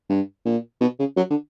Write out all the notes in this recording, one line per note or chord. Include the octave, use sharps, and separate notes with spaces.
G2
A#2
B2
C#3
F#3
D3